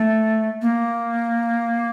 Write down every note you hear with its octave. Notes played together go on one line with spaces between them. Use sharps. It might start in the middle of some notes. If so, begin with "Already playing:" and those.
Already playing: A3
A#3